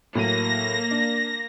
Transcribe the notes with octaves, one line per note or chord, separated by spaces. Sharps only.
A2 F#3 A#3 A#6 D#7
D4